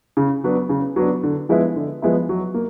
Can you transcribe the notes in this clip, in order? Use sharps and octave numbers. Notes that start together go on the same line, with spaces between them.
C#3
F#3 B3 D4
C#3
F#3 B3 D4
D3
F3 G#3 B3 E4
D3
F3 G#3 B3 E4
F#3
A#3